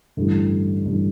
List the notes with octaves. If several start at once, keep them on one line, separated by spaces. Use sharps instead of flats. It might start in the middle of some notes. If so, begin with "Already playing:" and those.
A1 G2 D3
A1 G2 D3